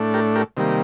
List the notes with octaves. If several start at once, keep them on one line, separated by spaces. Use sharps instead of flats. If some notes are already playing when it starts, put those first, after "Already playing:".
Already playing: A2 A3 D4
G4 A#4
G4 A#4
C3 D#3 G3 A#3